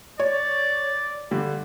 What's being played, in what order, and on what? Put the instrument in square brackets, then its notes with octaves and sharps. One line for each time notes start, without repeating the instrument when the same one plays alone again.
[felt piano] C#5 [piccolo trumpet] D5
[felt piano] G2 D3 G4